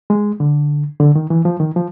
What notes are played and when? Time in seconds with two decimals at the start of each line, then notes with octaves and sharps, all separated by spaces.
0.10 G#3
0.40 D3
1.00 D3
1.15 D#3
1.30 E3
1.45 F3
1.60 D#3
1.76 F3